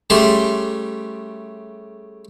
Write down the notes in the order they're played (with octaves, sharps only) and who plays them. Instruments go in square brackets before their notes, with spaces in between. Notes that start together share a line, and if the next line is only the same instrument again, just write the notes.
[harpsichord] C#3 G3 A3 C6